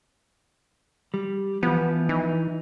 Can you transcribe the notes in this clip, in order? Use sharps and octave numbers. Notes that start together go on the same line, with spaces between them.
G3
E3 F3 B3
E3 D#4